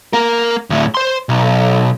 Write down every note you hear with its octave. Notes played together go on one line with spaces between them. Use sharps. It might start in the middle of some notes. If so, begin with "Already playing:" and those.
A#3 A#4
D2 A2
C5 C6
B1